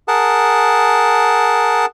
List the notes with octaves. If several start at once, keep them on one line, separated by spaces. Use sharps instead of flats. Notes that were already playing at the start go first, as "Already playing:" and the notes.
G#4 A#4 F#5 A5